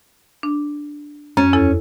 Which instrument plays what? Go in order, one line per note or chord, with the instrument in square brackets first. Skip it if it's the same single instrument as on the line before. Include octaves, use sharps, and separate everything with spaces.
[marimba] D4
[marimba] F#2 C#5 [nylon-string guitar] C#4
[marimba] E2 E4 A4